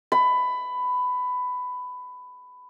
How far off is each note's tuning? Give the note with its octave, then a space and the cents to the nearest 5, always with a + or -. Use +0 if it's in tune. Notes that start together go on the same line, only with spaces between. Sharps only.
B5 +15